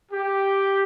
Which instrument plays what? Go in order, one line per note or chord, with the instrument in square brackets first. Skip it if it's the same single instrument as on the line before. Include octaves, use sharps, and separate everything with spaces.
[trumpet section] G4